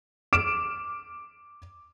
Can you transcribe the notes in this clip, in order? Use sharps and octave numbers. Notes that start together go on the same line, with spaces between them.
D6 F6 D7 E7